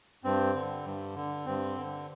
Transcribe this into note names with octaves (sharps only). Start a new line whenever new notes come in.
G2 C4
D3
G2
D3
G2 C4
D3